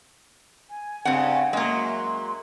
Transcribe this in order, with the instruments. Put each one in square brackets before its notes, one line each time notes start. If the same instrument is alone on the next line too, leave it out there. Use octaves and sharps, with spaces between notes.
[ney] G#5
[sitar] G2 C#3 [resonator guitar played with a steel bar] C4 F#5
[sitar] F#2 F#3 [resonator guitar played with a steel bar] G#3 A#3 [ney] C6